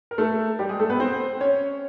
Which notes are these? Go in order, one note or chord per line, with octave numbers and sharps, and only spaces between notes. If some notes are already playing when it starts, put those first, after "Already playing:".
A#4
A3 A4
G3 G4
G#3 G#4
A3 A4
B3 B4
C4 C5
C#4 C#5